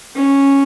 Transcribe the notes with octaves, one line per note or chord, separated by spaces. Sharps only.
C#4